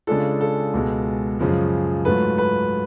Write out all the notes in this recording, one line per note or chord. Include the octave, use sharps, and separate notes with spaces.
C#3 G#3 D4 F4 A4
A4
C#2 B2 G#3
F#2 C#3 F3 G#3
G#2 F#3 A3 F4 B4
B4